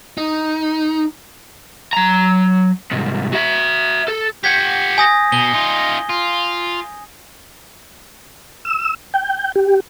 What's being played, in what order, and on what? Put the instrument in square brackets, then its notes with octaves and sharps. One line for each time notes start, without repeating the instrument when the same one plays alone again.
[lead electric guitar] D#4
[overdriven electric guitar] F#3 A#5
C2 G#2
F#4 E5
A4
[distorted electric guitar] G4 F#5 [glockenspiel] G6 G#6 B6
[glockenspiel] G#5 D#6 A#6
[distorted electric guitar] B2 [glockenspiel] G7
[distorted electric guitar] D#4 F4
F4
[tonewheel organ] E6
G5
G4